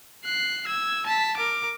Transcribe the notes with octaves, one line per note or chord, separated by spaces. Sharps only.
F#6 C7
E6 G#6
A5 B6
A#4 D6